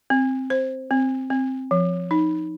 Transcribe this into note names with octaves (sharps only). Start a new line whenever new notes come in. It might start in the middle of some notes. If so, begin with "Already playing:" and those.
C4
C5
C4
C4
F3
D#4